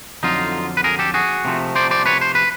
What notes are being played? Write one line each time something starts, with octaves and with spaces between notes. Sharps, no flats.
F2 D3 F#3 D#4 F4
B4
G#4 A#4
G4 A4
F#4 G#4
C3 F3 A3
C5 D5
C5 D5
B4 C#5
C5
B4